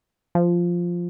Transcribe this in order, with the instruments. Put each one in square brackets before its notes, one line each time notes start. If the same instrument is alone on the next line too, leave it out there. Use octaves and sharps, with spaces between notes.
[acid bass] F3